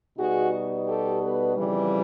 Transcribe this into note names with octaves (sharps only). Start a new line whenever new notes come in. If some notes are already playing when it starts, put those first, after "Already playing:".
B2 G3 B3 D#4 F#4 G#4
G4 A4
A4 B4
F2 C#3 E3 G3